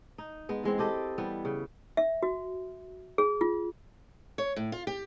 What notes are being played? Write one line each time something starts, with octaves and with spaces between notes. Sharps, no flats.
D#4
G#3 B3
E3 G#3 C4
E4 G4 A4 D#5
E3 G3 B3
C#3
E5
F#4
G#4
F4
C#5
A2
F4
G4